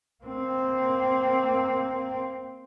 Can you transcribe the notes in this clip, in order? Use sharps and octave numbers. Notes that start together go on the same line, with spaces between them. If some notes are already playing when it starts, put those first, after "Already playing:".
A#3 C4